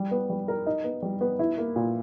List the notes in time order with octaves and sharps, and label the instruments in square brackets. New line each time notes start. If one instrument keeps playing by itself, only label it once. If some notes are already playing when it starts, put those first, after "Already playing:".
Already playing: [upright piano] G3
B3
G3
A#4
D#4
B3
G3
B3
E4
A#3
A#2